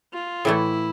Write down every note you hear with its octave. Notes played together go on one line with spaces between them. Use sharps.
F4
A2 E3 A3 E4